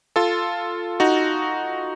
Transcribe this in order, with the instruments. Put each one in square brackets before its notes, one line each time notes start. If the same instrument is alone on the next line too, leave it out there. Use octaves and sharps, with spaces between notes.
[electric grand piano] F4 A4
D#4 F#4